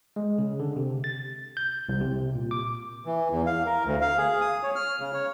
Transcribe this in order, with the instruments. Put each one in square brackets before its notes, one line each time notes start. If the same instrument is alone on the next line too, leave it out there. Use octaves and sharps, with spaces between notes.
[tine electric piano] G#3
C#3
D3
C3
A6
G6
C2
C3
A#2
D6
[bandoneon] E3
E2
F5
A#4
D2
F5
G#4
D#6
C#5
F6
C#3
C#5